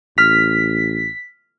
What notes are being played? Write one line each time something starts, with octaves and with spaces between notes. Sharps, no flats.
A1 F6 B6